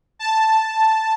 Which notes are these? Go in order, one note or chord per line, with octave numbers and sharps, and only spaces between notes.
A5